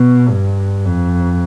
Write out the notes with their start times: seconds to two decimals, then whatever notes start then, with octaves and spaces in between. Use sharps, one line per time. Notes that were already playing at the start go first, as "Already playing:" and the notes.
Already playing: B2
0.29 G2
0.85 F2